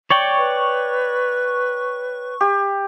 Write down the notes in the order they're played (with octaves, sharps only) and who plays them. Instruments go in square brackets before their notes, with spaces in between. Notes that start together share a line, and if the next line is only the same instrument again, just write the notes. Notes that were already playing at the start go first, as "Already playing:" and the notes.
[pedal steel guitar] C#5 D5 G5 [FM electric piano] C#6
[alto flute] B4
[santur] G4